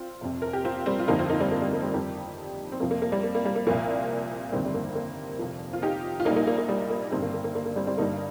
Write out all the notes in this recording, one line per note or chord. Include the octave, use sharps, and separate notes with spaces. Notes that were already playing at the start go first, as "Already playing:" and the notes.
Already playing: C4 F4
F1 F2 C3
A#4
G4
C4 F4
G3 C4
F4
G1 F2 F3 A#3 D#4
C4 F4
A#3 D#4
G3 C4
A#3
G3
A#3
G3 C4
F2 D#3 G3 D#4 G4
C4
F2 C3 F3 A#3
A#3
A#3
G3
A#3
A#3
G3
A#3
C2 A#2 F3 A#3
G1 F2 D#3 G3 C4
G3
A#3
A#3
F1 F2 F3
F4
D#4 G4
F4
A#1 A#2 G3 A#3 D#4
A#3 D#4
A#3
A#3
G3
A#3
G1 G2 D#3 G3 C4
A#3
A#3
A#3
A#3
A#3
G3 C4
G3 C4
G1 G2 G3 A#3 D#4